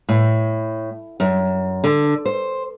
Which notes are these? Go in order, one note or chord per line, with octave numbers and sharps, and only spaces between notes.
A2
F#2
D3
C5